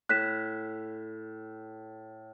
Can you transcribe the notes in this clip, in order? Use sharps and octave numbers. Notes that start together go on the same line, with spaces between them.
A2 F#6 B6 E7